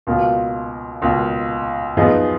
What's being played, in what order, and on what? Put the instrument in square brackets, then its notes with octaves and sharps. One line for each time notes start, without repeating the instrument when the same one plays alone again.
[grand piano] C#2 B2 A#3 F4
C#2 B2 A#3 F4
F#2 F3 B3 D#4 G#4